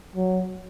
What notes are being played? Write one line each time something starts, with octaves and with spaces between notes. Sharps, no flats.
F#3